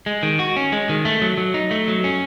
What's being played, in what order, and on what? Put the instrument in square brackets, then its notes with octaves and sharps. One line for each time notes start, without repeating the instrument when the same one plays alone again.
[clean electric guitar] G#3
D#3
F#4
C#4
G#3
D#3
A3
F#3
F#3
D#4
A3
F#3
C#4